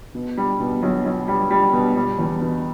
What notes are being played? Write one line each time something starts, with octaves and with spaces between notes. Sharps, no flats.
B2
G3
B2
B1
B1
G3
G3
B2
G3
E2
B2